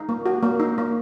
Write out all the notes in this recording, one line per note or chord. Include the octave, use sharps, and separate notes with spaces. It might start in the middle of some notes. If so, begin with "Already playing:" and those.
Already playing: D#4
A#3
F#4
A#3
D#4
A#3